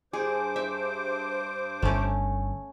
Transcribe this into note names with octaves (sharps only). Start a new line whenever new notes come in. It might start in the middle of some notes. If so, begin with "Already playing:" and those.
G2 G#4 C5 D6
E5
G1 A3 C#4